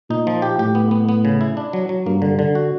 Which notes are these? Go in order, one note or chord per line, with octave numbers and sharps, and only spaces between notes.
A#2 D#4
F3
G4
A2 G4
B3
B3
B3
C#3
E4
D4
F#3
F#3
G2 A#3
D3
D3
F#4